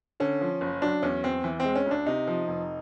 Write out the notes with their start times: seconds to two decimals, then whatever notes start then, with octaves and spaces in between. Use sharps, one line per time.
0.20 D3 C#4
0.41 F3
0.61 F#1
0.82 F#3 D4
1.03 E2 C#4
1.24 E2 C4
1.44 E3
1.60 C4
1.65 G#3
1.76 C#4
1.86 D2
1.91 D4
2.06 C3 D#4
2.27 F3
2.48 F1